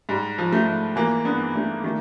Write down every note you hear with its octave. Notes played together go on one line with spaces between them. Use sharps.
G#2 G3
F3
A3
G#2
E3 A#3
G2 B3
G2 A3
D#3 A3